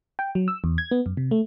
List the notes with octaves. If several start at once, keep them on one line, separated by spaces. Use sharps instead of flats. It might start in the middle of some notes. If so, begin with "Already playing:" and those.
G5
F#3
E6
E2
G#6
B3
F#2
C3
A3